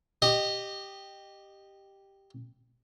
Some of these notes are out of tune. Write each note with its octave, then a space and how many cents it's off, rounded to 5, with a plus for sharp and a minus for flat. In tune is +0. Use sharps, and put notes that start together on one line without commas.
G4 +0 D#5 -15